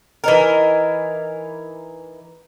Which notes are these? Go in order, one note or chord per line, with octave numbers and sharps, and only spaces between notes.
E3 D#4 A#4